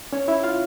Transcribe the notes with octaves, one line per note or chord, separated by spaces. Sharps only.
C#4 C#5
E4 E5
F4 F5